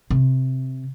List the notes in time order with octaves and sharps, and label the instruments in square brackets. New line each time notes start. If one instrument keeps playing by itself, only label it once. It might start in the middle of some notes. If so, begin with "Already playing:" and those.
[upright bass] C3